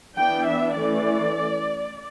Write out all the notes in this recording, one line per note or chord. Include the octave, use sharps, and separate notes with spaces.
E3 B3 D4 G5
E5
E3 A3 C#4 D5